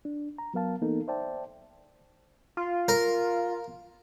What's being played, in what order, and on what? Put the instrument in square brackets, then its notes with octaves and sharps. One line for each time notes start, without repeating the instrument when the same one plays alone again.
[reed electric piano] D4
A#5
F#3 B3 A#4 F5 A5
E3 A#3 B3 D#4 A4 A#4
C5 D5 E5 G5 A5
[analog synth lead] F4
[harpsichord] A#4